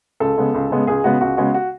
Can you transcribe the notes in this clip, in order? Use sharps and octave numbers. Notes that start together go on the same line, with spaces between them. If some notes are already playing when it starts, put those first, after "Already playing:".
C#2 A4
C#3 G#3 B3
C#2
C#3 G#3 B3
C#2 G#4
C#3 G#3 B3 F#4
C#2 F#4
C#3 G#3 B3 F#4
F#4